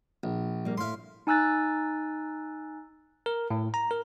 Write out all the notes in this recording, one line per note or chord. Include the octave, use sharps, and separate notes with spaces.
A#1
G3 A#3
A2 E5 F5 C6
D#4 G#5 E6 F#6 A6
A#4
A2
A#5
A#4